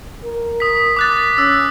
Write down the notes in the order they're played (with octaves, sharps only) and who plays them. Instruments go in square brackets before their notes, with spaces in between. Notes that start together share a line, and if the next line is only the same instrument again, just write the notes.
[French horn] A#4
[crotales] D#6 B6
D6 F#6 A6
[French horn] C#4 [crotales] E6